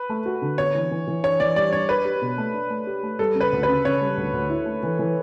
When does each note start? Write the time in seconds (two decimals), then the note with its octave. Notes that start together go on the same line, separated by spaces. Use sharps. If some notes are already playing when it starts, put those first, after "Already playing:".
Already playing: B4
0.10 A3
0.26 F#4
0.42 D3
0.58 B3 C#5
0.75 E3
0.91 E3
1.07 E3
1.23 D4 C#5
1.40 E3 D5
1.56 G3 D5
1.73 D4 C#5
1.89 D4 B4
2.05 G4
2.22 B2
2.38 A3
2.54 D4
2.70 A3
2.87 G4
3.03 A3
3.19 G3 A4
3.35 C#3
3.41 B4
3.52 D2
3.63 B4
3.68 C#3
3.85 C#3 C#5
4.01 G3
4.17 D2
4.33 D2
4.50 E4
4.66 A3
4.83 E3
4.99 E3